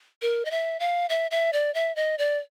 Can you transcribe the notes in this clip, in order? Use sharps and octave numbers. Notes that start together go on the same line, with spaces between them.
A#4
D#5
E5
F5
E5
E5
D5
E5
D#5
D5